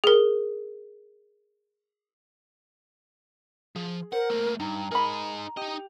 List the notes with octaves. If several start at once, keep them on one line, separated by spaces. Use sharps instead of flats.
G#4 A#4
F3 G#4
A#4 C5 F#5
A3 A#3
G2 D#4 A#5
D#4 G#4 A#4 B5
D#4 G4 D#5